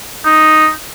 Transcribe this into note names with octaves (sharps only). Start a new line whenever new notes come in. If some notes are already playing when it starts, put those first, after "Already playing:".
D#4